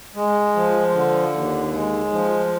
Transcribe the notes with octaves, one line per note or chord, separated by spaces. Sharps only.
G#3
F3
D3
D#2
G#3
F3